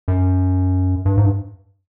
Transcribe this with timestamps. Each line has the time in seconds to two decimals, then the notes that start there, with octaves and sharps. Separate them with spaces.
0.08 F#2
1.05 G2
1.17 G#2
1.24 G2